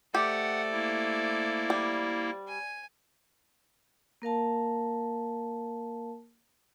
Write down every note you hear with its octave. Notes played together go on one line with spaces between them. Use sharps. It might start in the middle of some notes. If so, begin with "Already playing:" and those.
A3 G4 C5 D5 F#5
A#3 E4
G3
G#5
A#3 A#4 F5 A5